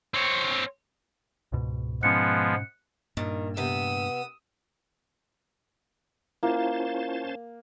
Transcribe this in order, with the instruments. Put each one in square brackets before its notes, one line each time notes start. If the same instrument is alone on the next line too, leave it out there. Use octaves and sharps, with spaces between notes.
[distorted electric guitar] C4 C#5
[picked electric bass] C#2 G#2 B2
[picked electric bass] G#2 B2 C#4 [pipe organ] F3 G#3 B3 [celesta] F#6 C#7
[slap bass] G2 A#2 [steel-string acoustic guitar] D#3
[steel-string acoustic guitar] C3 B3 [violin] D#6 E6
[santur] A#3 [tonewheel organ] C#4 C5 A5 [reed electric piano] E4 F4